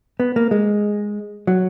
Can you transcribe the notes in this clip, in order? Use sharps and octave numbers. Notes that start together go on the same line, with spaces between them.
B3
A#3
G#3
F#3